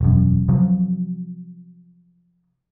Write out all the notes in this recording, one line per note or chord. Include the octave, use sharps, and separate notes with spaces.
E1 F#2
C3 F3 F#3